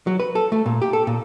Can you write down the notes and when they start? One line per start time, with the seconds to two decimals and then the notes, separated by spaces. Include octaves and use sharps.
0.07 F#3
0.20 B4
0.35 A4
0.52 A3
0.66 A#2
0.82 G4
0.93 A4
1.07 A#2